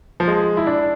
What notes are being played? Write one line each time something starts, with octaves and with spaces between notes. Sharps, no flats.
F3
G#3
E4
D4